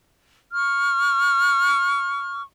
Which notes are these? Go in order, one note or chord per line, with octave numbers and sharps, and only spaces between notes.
C#6 F6